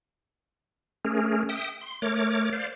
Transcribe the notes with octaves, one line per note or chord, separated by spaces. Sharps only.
A3 C#4 G#4 A#4
E5 G5 D#6
C6
A3 A#4 C#5 D6
C5 D5 F5